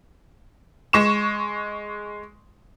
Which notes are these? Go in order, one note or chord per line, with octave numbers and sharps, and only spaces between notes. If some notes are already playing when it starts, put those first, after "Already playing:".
G#3 C#6 E7